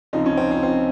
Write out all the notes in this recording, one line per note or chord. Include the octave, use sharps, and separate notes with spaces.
C#2 C3 F3 D#4
C#4
C4
C4
C4